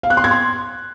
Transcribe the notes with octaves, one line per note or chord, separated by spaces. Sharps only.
F5
F#6
C6
G#6
C6